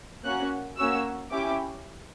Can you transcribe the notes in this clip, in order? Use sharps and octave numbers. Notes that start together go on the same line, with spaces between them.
A#3 C#4 F#4 F#6
A#3 C#4 F#4 E6
C#4 E4 G4 D6